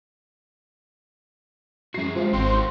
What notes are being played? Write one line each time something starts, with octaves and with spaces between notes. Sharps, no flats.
F#2 F#4 G#4 C7
D3 G#3 F4 C5
G#1 C4 F#4 F5 G5